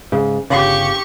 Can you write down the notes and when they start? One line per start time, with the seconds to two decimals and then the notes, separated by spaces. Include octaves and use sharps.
0.12 G#2 C#3
0.50 G1 C#3 G4 C#6